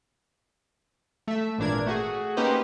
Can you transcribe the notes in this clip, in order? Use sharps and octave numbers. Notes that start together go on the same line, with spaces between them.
A3 E5
G#1 A#2 E3 D4 A#4 G#6
A3 F#4 G#4
A#3 C#4 D#4 G4 B4 C5